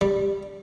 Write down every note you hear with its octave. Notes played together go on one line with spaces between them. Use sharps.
G3